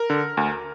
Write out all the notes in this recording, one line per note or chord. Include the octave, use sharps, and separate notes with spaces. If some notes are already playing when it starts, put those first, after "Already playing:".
Already playing: A#4
D3
D2